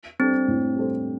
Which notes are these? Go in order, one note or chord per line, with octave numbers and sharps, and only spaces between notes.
G3 C4 D4 A4 C5
A2
G3 D4 A4 C5